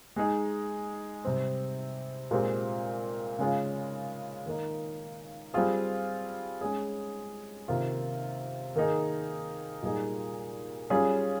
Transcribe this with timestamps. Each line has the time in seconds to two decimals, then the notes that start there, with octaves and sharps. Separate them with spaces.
0.16 G#3 D#4 G#4
1.24 C3 G3 C4
2.31 A#2 G#3 C4 G4
3.39 C#3 G#3 C#4 F4
4.46 D#3 A#3 D#4
5.54 G3 C4 F4 G#4
6.61 G#3 C#4 G#4
7.68 C3 D#3 A#3 F4
8.76 D#3 A#3 D#4 G#4
9.83 A#2 G3 A#3 D#4 G#4
10.90 G3 C#4 F4 G#4